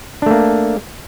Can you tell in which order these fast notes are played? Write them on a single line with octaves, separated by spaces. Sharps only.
D4 A3 A#3